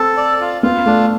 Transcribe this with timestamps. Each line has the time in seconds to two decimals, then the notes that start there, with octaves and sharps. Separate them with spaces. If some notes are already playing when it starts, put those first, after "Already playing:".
Already playing: C4 A4
0.17 D5
0.41 F4
0.62 B3 F4
0.86 A3 D4